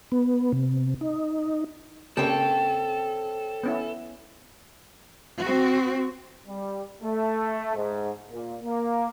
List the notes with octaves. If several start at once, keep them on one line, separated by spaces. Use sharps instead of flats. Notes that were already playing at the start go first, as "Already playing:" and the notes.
B3
C3
D#4
C#3 A#3 C4 G4 A4 C#5 G5
B3 C#4 E4
C4 F#4
G3
A3
G#2
A#2
A#3